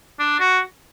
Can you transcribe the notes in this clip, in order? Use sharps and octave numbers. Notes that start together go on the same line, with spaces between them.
D4
F#4